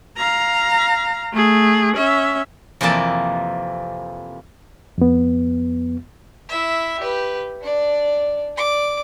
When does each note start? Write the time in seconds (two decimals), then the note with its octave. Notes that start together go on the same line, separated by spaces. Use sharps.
0.17 F5 A#5
1.33 A3 G#4
1.97 C#4 E5
2.81 F2 C3 E3 A#3 D5 A5
4.98 F2 B3
6.49 E4 E5
7.00 G4 B4
7.61 D4 D5
8.56 D5 D6